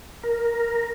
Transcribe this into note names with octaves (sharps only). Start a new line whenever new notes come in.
A#4